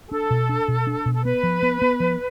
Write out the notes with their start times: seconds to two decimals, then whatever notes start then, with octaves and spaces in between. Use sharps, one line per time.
0.07 G#4
0.11 D4 A4
0.30 B2
0.49 D4
0.68 B2
0.87 D4
1.06 B2
1.14 A4
1.25 B3 B4
1.43 F3
1.63 B3
1.82 B3
2.00 F3